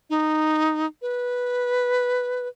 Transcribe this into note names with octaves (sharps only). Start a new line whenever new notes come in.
D#4
B4